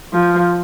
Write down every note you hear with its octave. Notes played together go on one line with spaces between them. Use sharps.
F3